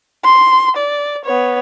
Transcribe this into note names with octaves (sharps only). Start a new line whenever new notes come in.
C6
D5
B3 C#5